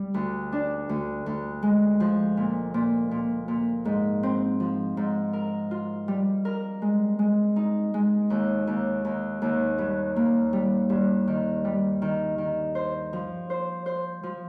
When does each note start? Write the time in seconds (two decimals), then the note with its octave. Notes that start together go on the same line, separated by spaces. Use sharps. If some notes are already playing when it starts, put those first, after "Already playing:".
Already playing: G3
0.14 D2
0.52 D4
0.89 D2
1.26 D2
1.63 G#3
2.00 F3
2.37 A#2
2.74 A#2
3.11 A#2
3.48 A#2
3.85 G#2
4.23 C4
4.60 F3
4.97 G#2
5.33 A#4
5.71 F4
6.08 G3
6.45 A#4
6.82 G#3
7.19 G#3
7.56 D#4
7.94 G#3
8.30 D#2
8.67 D#2
9.05 D#2
9.42 D#2
9.78 G2
10.16 A#3
10.53 G3
10.90 G2
11.28 D#3
11.65 G3
12.02 D#3
12.38 D#3
12.75 C5
13.13 F3
13.50 C5
13.86 C5
14.23 F3